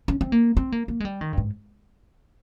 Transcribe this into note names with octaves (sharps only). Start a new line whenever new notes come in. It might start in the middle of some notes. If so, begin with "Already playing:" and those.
C#4
C4
A#3
C4
A#3
A#3
G#3
G3
D#3
G2
G#2